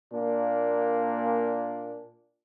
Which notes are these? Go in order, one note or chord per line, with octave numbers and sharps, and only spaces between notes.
A#2 A#3 D4